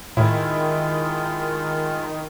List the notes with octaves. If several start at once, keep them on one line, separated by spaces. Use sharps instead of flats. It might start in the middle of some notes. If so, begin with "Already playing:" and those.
A2 D#3 G#3 E4 F4